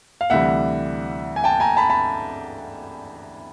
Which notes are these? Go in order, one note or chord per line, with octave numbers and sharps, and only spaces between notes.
F5
D2 C3 E3 G3 E5 F#5
G#5
G5 A5
G#5 A#5
A5 B5
A5 B5